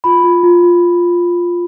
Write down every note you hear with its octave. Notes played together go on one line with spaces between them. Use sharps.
F4 B5
F4
F4
F4